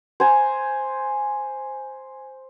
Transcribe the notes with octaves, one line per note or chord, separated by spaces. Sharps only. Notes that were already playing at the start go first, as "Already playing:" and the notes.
C5 G#5 A#5